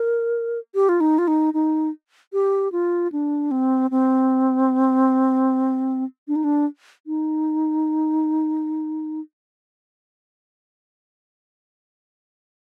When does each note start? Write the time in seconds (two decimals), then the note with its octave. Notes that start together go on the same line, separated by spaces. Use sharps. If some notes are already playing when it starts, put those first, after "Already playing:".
Already playing: A#4
0.75 G4
0.89 F4
1.01 D#4
1.18 F4
1.28 D#4
1.54 D#4
2.33 G4
2.72 F4
3.12 D4
3.51 C4
3.91 C4
6.28 D4
6.36 D#4
6.44 D4
7.07 D#4